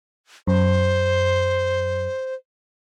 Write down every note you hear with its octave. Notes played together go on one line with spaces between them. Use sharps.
F#2 C5